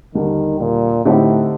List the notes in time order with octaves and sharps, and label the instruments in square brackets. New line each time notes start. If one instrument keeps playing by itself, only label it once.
[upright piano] D#2 D3 G3 D4 [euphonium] D#3
[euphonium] A#2
[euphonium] A2 [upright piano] D3 A3 C4 D#4 G4